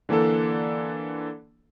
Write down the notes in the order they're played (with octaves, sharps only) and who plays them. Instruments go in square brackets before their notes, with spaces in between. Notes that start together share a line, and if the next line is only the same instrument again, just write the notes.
[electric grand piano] D3 E3 A#3 D4 A4